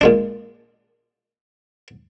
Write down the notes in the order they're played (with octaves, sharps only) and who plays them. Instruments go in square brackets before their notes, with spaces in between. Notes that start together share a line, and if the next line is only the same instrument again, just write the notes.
[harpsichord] A#2 G#3 D4